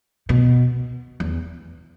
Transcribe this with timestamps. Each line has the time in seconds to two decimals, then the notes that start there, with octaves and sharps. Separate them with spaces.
0.29 B2
1.20 E2